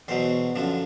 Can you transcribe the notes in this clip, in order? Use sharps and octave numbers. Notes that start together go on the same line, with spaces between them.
E2 B2 F#3 C5
F#2 D3 F3